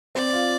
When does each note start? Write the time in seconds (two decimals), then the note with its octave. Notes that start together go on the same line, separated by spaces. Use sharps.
0.15 C4 D5
0.33 F4